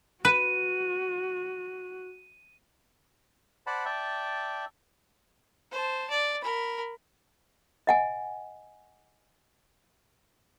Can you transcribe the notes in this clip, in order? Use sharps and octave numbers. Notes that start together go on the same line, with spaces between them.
F#4 B4 D#7
C5 D5 F#5 A5 B5
D5 E5 G5 A5
C5 A5
D5
A#4 B5
D#5 F#5 G#5